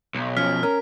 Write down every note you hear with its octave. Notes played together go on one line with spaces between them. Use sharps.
B1
F3 C#4 F6 B6
C#4 A#4 F6